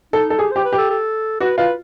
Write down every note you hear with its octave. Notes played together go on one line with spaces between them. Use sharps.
D#4 A4
A4
G4 G#4
G4 C5
B4
G4
A4
A4
F#4 B4
F4 B4